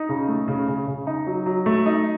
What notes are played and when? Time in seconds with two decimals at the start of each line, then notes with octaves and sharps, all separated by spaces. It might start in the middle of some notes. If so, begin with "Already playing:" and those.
Already playing: D#4
0.09 C#3
0.28 A3
0.48 C#3
0.68 C#3
0.87 C#3
1.07 D#4
1.27 F#3
1.46 F#3
1.66 A3
1.86 D#4